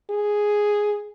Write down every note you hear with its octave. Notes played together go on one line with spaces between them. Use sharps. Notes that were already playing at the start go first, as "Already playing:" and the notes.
G#4